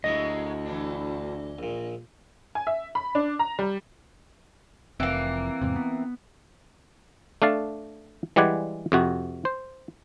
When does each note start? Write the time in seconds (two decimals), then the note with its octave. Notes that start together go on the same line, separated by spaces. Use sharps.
0.04 D2 F#3 G#3 A#3 E4 C#5 D#5 D#6
0.65 E3 D4
1.59 A#1 A#2
2.55 G#5
2.67 E5
2.95 B5
3.15 D4
3.39 A#5
3.59 G3
5.00 F1 F2 E3 A#3 C4
5.62 E2 G#2 C3
5.76 B3
7.42 A3 D4 F5 A5
8.36 E3 G3 G#3 D5 F#5 G#5
8.92 F2 C3 F#4
9.45 C5